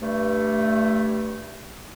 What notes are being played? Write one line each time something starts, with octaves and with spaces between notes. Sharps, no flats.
G2 A3